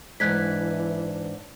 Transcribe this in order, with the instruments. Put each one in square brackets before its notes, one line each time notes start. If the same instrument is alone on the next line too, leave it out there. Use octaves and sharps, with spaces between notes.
[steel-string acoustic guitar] G#2 D4 [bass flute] E3 [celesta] F#6 G#6 B6